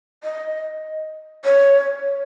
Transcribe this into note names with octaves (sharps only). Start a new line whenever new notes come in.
D#5
C#5